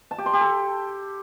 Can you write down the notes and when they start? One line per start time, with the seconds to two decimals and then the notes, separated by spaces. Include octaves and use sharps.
0.11 A5
0.18 G4
0.26 C6
0.33 G4
0.41 A4